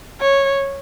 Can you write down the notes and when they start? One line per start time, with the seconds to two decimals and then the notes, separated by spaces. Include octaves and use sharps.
0.21 C#5